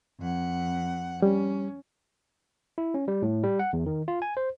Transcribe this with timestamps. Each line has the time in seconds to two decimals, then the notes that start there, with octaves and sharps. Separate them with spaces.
0.21 F2 F#5
1.22 G3 C#4
2.78 E4
2.94 C#4
3.08 G3
3.22 A2
3.43 G3
3.59 F#5
3.73 E2
3.86 D#3
4.08 F4
4.22 G#5
4.37 C5